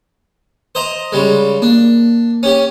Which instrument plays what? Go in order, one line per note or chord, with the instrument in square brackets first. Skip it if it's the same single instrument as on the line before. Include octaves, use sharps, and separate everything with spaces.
[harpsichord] C5 D#5 A#5
C#3 G3 G#3
[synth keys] A#3 [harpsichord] D4
[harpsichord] C#4 G4